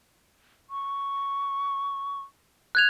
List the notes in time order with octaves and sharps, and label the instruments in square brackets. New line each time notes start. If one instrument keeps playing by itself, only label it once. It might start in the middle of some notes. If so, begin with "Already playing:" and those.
[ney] C#6
[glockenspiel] F#6 G#6 F7